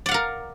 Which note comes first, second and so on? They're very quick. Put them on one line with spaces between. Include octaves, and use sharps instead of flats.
D5 F#5 F5 A#4